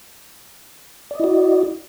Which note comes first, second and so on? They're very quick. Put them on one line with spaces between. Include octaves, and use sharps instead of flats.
D5 D#5 E4 F#4